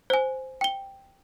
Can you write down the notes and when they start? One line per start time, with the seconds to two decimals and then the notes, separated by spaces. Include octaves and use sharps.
0.10 C5 G#5
0.61 G5 G7